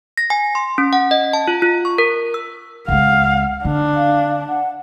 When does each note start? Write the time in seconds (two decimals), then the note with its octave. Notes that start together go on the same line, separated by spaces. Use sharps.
0.17 A#6
0.30 G#5
0.55 C6
0.78 C#4
0.93 F#5
1.11 D#5
1.33 A5
1.48 F4
1.62 F4
1.85 C#6
1.98 A#4
2.34 E6
2.88 C#2 G#3 F5 F#5
3.65 D3 D4
3.96 F5
4.49 F#5